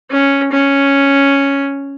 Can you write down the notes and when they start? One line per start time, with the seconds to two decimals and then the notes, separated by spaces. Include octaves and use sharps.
0.10 C#4
0.52 C#4